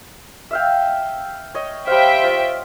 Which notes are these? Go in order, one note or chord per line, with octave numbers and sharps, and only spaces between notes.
E5 F5 G5
C#5 D#5
G3 C5 E5 F5 G5
F4